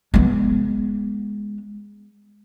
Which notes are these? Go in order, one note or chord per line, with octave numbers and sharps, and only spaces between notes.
G#3 B3